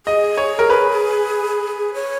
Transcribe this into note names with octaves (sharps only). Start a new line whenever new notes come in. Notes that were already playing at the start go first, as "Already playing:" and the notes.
G#4 D#5
C#5
A#4
B4
C#5